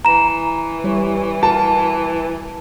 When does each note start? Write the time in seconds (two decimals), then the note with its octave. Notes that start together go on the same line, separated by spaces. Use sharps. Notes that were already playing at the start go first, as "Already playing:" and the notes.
0.05 E3 A#5 E7
0.84 G3 E4 C#5
1.43 F#4 A#4 A5